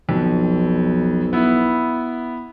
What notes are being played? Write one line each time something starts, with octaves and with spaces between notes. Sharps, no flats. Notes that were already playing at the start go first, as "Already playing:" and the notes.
B1 F2
B3 E4